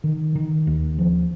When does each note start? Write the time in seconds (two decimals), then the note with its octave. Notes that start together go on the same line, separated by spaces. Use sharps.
0.04 D#3
0.35 D#3
0.67 D#2
0.99 F3